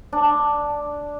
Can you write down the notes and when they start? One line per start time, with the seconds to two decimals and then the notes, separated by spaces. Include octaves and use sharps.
0.13 D4